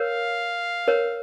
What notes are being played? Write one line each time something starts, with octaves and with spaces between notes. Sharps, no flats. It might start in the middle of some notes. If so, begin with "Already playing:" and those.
Already playing: A#4 C#5 F5
A#4 C#5